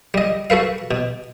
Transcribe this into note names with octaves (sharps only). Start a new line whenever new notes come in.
G3 D#5
F#4 A4 B4 F5
B2